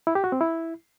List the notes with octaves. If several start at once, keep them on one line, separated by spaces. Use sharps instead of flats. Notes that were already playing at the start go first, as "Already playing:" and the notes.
E4
G4
F#4
C4
E4